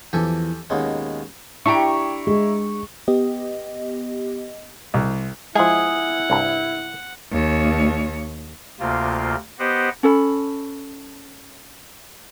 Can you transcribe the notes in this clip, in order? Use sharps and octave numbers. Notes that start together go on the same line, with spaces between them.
E2 E3 F3 G4 A4 G#5
D#2 B2 G#3 C#4
D4 E4 G4 A#5 C#6 D7
G#3
B3 G4 D#5
C2
F3 G#3 E4 G#4 F#5
C2 G2
D#2 C#5
D2 C3 A#3 F4
B3 G4 C5 D#5 F#5
C#4 A4 B5